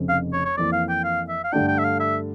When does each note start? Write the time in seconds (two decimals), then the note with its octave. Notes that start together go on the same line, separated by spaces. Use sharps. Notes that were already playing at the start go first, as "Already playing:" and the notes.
Already playing: F1 F2 C#3
0.09 F5
0.33 C#5
0.45 C#5
0.57 F2 E3 A#3 D5
0.72 F5
0.89 G5
1.04 F5
1.29 E5
1.44 F5
1.53 G2 D3 A3 D4 G5
1.68 G5
1.78 E5
1.84 F5
2.00 E5